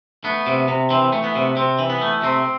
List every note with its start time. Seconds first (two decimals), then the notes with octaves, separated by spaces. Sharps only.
0.24 A3 B3
0.47 C3
0.68 C3
0.90 E3 C4
1.13 A3
1.24 B3
1.35 C3
1.56 C3 C4
1.79 E3
1.90 B3
2.02 A3
2.22 C3 C4